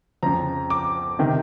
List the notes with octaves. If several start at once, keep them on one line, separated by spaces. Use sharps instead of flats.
F2 C#3 F3 A#5
D6
C3 D#3